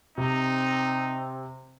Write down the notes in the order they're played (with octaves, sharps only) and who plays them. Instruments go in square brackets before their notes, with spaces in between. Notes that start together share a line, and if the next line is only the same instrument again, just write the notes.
[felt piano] C3 [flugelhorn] C4 [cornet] D#4